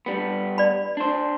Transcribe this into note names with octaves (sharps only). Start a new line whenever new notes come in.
G2 G3 B3
D5 B5
D4 C5